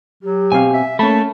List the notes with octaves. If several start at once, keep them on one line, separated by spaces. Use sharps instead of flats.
F#3 G4
B2 C4 F5 G#5
E5
A3 A#3 C#4 A5 B5